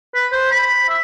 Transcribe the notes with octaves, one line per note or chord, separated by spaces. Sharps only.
B4
C5
B5
E5